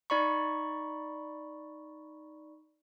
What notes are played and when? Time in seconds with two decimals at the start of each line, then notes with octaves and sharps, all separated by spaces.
0.10 D#4 D5 B5 C#6